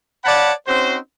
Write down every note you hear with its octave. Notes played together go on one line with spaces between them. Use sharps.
C#5 D5 F5 F#5 A5 B5
C4 C#4 D#4 F#4 C5